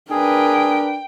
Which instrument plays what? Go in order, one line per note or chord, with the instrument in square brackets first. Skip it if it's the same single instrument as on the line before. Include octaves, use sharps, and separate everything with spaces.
[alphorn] D4 [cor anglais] G#4 [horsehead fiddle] A#4 B4 [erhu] G5